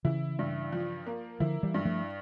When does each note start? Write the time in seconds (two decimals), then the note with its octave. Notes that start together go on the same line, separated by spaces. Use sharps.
0.05 C#3 E3 E4
0.39 G2
0.72 F3
1.07 A#3
1.40 D3 F3 E4
1.63 E3 G3
1.74 G2
1.85 F3 A3